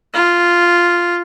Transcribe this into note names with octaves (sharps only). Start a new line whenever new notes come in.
F4